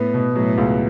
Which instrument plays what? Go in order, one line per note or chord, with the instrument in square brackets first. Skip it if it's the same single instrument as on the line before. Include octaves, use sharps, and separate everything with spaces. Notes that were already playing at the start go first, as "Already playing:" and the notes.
Already playing: [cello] A2 [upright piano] B3
[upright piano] B2
[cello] A2 [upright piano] F#3
[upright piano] C#2